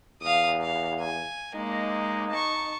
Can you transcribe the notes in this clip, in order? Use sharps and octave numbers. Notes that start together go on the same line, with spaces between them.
E2 F5 D#6
F5
G#5
G#3 A#3 D#4
A5 C#6